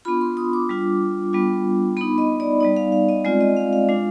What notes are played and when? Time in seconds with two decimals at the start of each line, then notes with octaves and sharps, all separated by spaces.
0.05 B3 D4 F4 B5
0.21 C6
0.37 D#6
0.53 D6
0.69 G3 D4 F4
1.33 G3 B3 D4 F4
1.97 B3 D#4 B5
2.18 D#5
2.40 D5
2.60 G3 B3 D#4 D5
2.77 F5
2.92 F5
3.09 D#5
3.25 G#3 C4 F4 D5
3.41 D#5
3.57 F5
3.73 F5
3.89 G#3 D4 F4